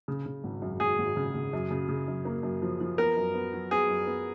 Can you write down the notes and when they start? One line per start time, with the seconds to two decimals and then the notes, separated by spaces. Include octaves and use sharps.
0.08 C#3
0.26 C#3
0.44 G#1
0.62 F#2
0.80 G#1 G#4
0.99 G#1
1.17 C#3
1.35 C#3
1.53 F#2
1.71 C#3
1.88 C#3
2.08 F#2
2.25 A#3
2.43 F#2
2.62 F3
2.81 F3
2.98 B3 A#4
3.17 F#2
3.34 B3
3.53 F#3
3.71 B3 G#4
3.88 F#2
4.06 B3